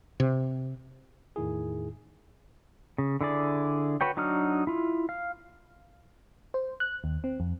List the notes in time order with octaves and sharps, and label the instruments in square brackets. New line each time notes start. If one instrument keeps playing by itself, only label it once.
[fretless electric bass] C3
[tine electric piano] E2 A2 D#3 E4 G#4
[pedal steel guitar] C#3
D3 E4 G#4 D5
F#4 B4 C#5 G5
F#3 D4 D#4 F#4 F6
E4 F4
F5
[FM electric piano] C5
F#6
D#2
C4
F2